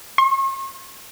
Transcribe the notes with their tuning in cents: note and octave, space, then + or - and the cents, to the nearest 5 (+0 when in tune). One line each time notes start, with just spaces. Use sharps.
C#6 -45